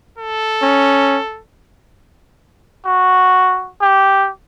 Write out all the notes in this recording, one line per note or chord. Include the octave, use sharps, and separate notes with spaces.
A4
C#4
F#4
G4